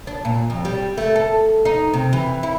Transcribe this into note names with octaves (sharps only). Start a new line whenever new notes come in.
D4
A#2
F2
G3
A3
A4
D#4
C3
E3
E4